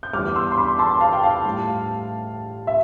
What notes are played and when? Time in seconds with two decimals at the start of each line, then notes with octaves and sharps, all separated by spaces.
0.03 G6
0.13 E2 D3 G3 D6 F6
0.36 C6 E6
0.52 C6
0.58 B5 D6
0.79 A5 C6
1.01 F5 A5
1.13 G5
1.23 F5 A5
1.45 A2 G3
2.67 E5